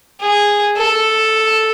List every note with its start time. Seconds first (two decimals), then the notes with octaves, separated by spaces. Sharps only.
0.21 G#4
0.77 A4